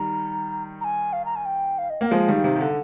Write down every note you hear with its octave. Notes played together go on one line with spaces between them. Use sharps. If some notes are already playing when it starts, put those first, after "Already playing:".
Already playing: D#3 G3 A#5
A#5
G#5
F5
A#5
G#5
G5
F5
D#5
A#3 G5
F3 G#3 F5
D#3 G3
C3 D#3
C3
D3